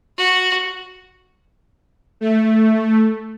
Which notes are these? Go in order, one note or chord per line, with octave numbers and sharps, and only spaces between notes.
F#4
A3